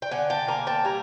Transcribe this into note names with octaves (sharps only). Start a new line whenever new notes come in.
G5
D3 F#5 G#5
G5 A5
A#3 G#5 A#5
G5 A5
G3 G#5 A#5